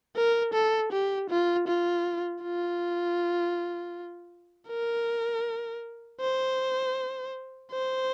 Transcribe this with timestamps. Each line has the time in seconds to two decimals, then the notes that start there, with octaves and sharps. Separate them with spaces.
0.16 A#4
0.53 A4
0.92 G4
1.30 F4
1.67 F4
2.43 F4
4.69 A#4
6.21 C5
7.72 C5